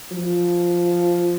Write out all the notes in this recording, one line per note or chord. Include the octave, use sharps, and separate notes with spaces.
F3